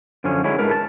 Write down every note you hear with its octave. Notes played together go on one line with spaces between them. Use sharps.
F#2 D3 F3 C#4
D3 D#3 F#3 G#3 C#4 E4
A2 G#3 A3 A#4 B4
A5